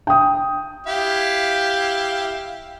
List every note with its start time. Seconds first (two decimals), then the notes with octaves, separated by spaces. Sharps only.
0.07 G5 D#6
0.87 E4 G4 F5